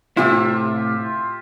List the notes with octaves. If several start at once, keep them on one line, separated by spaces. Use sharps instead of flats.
A2 C3 E4 F4 G4 E5